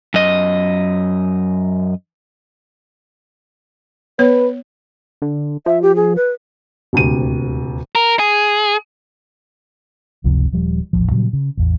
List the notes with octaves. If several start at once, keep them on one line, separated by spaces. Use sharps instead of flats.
F#2 D#5
B3 B4 C#5
D3
F3 E5
G4
G#4
B4
D#1 D2 C3 D#7
A#4
G#4
F#1 C#2 C3 F3
D#1 F3 G3
D#1 A1 F3
A#2 C#3 F#3 G3
C#3
A1 E2